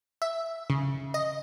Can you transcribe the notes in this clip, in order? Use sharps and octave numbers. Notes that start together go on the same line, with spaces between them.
E5
C#3
D#5